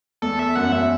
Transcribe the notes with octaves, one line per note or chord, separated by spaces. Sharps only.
E2 A4
E5
F#2 F#5
E2
F#2 E5